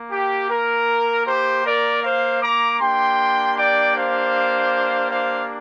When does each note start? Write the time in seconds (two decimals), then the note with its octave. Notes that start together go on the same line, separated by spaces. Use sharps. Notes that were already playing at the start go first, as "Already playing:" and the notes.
Already playing: A#3
0.11 G4
0.50 A#4
1.27 G4 C5
1.65 A#4 D5
2.03 C5 F5
2.42 A#5 D6
2.80 A#3 D4 G4 G5 C6
3.57 D5 G5
3.95 C5 F5
5.11 C5 F5